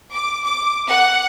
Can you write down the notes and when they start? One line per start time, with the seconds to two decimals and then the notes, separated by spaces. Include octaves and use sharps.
0.14 D6
0.46 D6
0.88 F#5